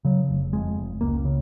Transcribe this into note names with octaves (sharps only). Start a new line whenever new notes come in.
C#3 F#3
F1
F2 G#3
F1
C#2 A#3
C#3